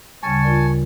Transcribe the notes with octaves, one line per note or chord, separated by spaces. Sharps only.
D2 C#3 G3 G#5 A5 C#6
F4 A#4 D5